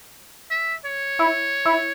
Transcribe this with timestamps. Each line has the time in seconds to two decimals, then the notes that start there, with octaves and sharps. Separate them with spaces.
0.51 E5
0.85 C#5
1.19 E4
1.65 E4